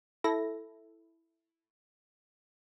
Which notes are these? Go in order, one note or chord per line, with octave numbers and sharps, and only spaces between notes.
E4 A4 A#6